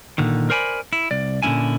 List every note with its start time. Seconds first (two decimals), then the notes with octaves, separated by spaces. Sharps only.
0.18 A#2 D3 D#3
0.50 A#4 C5 D5 G#5 A5 B5
0.93 E4
1.11 C2 D5
1.43 A#2 D3 A3 C#4 E4 G#5